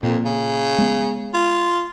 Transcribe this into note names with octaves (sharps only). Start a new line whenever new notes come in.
F2 A#2
C#3
G#3 B3
F4